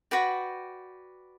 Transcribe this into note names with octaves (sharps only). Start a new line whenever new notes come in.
F#4 B4 D5 G5